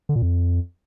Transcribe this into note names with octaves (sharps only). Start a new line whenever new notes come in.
D3
A#2
F2